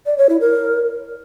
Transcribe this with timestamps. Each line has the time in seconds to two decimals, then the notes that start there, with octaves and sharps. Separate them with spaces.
0.06 D5
0.18 C#5
0.29 E4
0.41 A#4